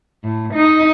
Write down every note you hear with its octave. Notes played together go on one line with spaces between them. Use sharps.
A2
D#4